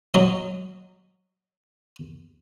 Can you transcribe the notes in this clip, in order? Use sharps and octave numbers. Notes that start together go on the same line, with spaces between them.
F#3 D#5